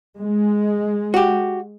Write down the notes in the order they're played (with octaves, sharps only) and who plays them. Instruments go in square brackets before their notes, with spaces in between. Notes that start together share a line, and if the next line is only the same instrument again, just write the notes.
[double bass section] G#3
[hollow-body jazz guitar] F#4 G4